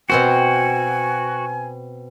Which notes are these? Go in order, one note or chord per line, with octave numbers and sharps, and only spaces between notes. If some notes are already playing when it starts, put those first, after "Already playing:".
B2 C4 F#4 C5 G#5